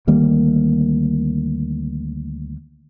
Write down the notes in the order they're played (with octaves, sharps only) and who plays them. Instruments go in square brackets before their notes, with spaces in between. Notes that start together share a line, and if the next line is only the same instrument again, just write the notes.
[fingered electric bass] D2 D#3 G3 A#3